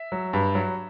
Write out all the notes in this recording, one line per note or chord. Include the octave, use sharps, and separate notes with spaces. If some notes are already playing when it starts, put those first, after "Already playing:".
Already playing: E5
F#3
G2
F#3